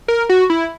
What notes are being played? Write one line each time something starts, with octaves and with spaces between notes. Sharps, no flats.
A#4
F#4
E4